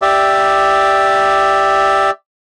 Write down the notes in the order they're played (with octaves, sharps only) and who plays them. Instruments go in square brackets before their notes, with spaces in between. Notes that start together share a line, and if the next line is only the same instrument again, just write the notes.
[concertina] G4 D5 E5